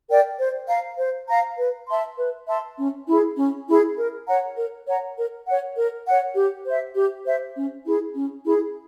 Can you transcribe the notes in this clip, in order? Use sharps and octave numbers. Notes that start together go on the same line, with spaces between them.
A#4 D5 G5
C5
F5 A#5
C5
F5 A#5
B4
E5 A5 C6
B4
E5 A5 C6
C#4
E4 G#4
C#4
E4 G#4
A#4
C#5 F#5 A#5
A#4
C#5 F#5 A#5
A#4
C#5 F#5
A#4
C#5 F#5
G4
C5 E5
G4
C5 E5
C#4
E4 G#4
C#4
E4 G#4